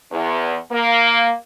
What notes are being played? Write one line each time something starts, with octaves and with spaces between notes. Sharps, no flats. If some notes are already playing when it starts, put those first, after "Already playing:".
E2
A#3